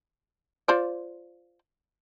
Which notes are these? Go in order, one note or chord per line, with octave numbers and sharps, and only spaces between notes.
F4 C5 D5